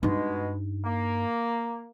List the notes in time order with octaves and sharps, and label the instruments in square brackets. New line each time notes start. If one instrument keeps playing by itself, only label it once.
[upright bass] G2 D#4 [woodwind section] B2 G#3
[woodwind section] A#3